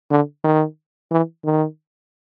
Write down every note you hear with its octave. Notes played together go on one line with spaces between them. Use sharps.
D3
D#3
E3
D#3